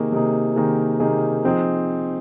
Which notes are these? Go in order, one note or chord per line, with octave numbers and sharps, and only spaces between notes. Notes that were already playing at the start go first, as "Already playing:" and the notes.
Already playing: C3 D#3 A#3 D#4 G#4
C3 D#3 A#3 D#4 G#4
C3 D#3 A#3 D#4 G#4
C3 D#3 A#3 D#4 G#4
F3 C4 D#4 G#4